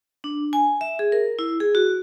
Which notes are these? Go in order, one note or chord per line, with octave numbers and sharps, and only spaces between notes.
D4
G#5
E5
G#4
A#4
E4
G#4
F#4